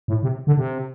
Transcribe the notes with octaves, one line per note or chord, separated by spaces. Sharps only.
A2
C3
D3
C3